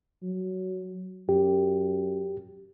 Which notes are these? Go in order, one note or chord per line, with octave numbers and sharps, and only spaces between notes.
F#3
F#2 G4